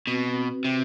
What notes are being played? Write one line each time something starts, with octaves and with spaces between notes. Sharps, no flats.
B2 C4 F#4 B4
C3